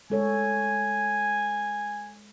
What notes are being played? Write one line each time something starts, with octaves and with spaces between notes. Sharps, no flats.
G#3 A4 C#5 G#5